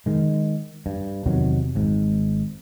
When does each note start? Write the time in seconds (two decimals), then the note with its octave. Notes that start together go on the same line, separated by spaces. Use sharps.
0.06 D#3 G#3
0.86 G2
1.26 E2 C3 D#3 F#3
1.75 G#1 G#2